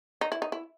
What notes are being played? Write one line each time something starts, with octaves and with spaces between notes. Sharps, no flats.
D#4
E4
D#4
E4